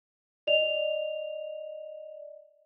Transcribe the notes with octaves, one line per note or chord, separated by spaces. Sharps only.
D5 D#5 F7